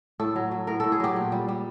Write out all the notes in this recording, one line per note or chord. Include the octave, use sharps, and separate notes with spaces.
A2 A4
F#3
F#3
A2 A#4
A2 A4
G#4
F#3 G4
A#2
G3
G3